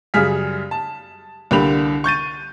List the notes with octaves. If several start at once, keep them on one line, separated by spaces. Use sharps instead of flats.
F#2 C#3 G3 G#4 F6 B6
A5
C2 D3 A#3 G4 B5 F7
C#6 G6 A6 D#7